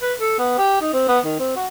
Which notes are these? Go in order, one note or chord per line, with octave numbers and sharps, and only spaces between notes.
B4
A4
B3
G4
D#4
C4
B3
D#3
C4
F#4